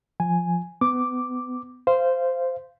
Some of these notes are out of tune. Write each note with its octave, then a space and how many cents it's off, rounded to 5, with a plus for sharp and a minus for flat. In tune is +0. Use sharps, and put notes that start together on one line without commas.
F3 +0 G#5 +0
B3 +30 D6 +0
C5 -10 F5 -15